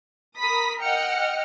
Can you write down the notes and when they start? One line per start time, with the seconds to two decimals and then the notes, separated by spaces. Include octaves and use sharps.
0.38 A#4 B5 D#6 B6
0.80 D#5 F#5 G5 F6 C#7